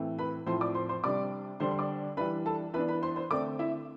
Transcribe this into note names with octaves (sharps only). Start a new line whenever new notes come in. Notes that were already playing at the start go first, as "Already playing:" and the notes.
Already playing: A2 E3 A3 C4
B4 B5
A2 F3 C4 C5 C6
D5 D6
C5 C6
C5 C6
C3 G3 D4 D5 D6
D3 G3 D4 C5 C6
C6
D5 D6
E3 G3 D4 B4 B5
A4 A5
E3 B3 D4 B4 B5
B4 B5
C5 C6
C5 C6
D3 A3 C4 D5 D6
E4 E5